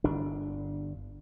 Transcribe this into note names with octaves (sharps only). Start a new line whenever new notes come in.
G1 D4